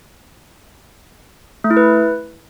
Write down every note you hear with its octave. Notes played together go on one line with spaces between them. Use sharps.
A3
E4
B4